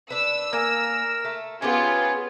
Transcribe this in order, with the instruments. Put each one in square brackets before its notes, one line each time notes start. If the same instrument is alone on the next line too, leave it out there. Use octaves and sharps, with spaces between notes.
[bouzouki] D4 B4 [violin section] E6
[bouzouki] A#3 G#5 [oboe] A#4
[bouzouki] A3
[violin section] B3 F4 [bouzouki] C#4 G4 G#4 [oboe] G#5